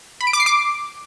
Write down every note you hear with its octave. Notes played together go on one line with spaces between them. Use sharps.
B5
D7
D6
C7
D6